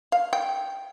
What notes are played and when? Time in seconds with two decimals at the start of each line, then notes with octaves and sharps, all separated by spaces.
0.12 F5
0.33 G5